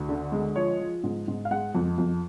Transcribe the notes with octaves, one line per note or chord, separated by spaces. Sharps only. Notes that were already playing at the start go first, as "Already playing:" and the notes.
Already playing: D2
D3
G#3
F3 C#5
F3
G#2
G#2
F5
G#3 F#5
F2
F2